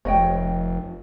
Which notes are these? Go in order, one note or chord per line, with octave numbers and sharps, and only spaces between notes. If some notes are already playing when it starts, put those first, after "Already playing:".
F1 C#5 D#5 G5